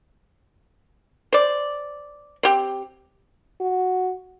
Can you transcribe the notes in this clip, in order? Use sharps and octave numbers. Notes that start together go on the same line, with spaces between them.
C5 D5
C4 G4
F#4